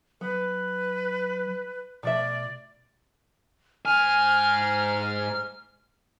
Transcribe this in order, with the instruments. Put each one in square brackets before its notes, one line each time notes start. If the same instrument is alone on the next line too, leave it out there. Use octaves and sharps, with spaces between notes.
[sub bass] F#3 [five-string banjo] B3 [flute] B4
[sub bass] B2 [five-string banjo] F3 A3 E5 [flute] D5
[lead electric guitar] G#2 G#5 [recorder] F6